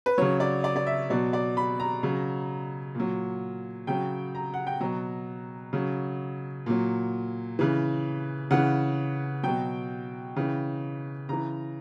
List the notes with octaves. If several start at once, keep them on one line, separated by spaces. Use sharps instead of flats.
B4
C#3 F#3 C#5
D5
D5
D5
E5
B2 F#3 D5
D5
B5
A#5
C#3 F#3
A#2 F#3
C#3 F#3 G5
A#5
F#5
G5
B2 F#3 A#5
C#3 F#3
A#2 F#3
C#3 E3
C#3 E3 F#5
B2 F#3 G5
C#3 E3
C#3 E3 A#5